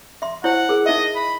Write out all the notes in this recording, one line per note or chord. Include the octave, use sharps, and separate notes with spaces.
E5 C6
E4 C5 C#5 F#5
G#4 A#4
D#4 D#5 E5
B5